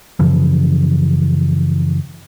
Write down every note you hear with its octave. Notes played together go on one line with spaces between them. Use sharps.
F#2 C#3 E3 F3